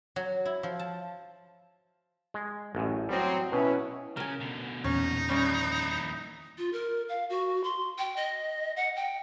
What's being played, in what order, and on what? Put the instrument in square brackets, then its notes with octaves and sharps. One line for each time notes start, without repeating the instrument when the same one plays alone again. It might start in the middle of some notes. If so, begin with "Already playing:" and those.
[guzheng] F#3
E4
F3
A5
[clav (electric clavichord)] G#3
A1 F#2 A2
[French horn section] F#3 C4 [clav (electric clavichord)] G3 D#5
[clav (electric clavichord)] B2 [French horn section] C#4 E4 B4
[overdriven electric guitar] C#3 [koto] A#4 G#5
[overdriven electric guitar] B2 D3
[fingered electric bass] E2 A#2 [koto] C#4 [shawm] D#4
[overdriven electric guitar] D#2 E4 [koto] G3 C#4 D5
[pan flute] F4
A#4
F5
F#4
C6
G5
D#5
F#5
G5